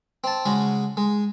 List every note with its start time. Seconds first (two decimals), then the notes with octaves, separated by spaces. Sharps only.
0.24 C4 A5
0.46 C#3 G#3 F#4
0.97 G#3